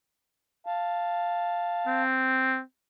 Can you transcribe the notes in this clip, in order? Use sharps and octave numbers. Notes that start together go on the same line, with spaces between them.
F5 A5
C4